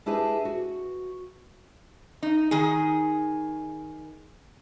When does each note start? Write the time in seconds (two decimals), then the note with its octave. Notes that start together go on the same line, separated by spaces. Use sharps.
0.06 D4 E4 G4 G#4 B4 D#5
0.45 F#4
2.23 D#4
2.51 D#3 G#4